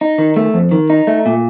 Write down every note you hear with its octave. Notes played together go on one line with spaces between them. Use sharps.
D#4
D#3
A3
F2
D#3
D#4
A3
A#2